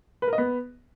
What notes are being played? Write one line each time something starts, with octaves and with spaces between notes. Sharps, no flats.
B4
A#4
D#5
B3